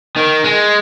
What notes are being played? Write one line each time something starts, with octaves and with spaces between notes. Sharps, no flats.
D#3
G#3